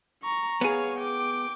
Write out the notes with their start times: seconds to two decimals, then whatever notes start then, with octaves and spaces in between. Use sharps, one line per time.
0.23 A#5 C#6
0.61 B3 G#4 C#5 F5
0.99 G5 D6